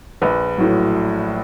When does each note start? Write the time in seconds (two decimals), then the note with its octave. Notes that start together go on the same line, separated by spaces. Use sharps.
0.22 A#1 B4
0.58 A2 F#3